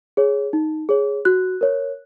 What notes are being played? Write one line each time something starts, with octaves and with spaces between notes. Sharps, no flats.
G#4 C#5
D#4
G#4 C#5
F#4 F#6
A#4 C#5